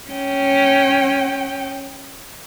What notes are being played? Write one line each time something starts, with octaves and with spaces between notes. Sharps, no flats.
C#4 G5